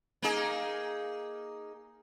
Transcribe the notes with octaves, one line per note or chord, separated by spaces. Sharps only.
A#3 D#4 G#4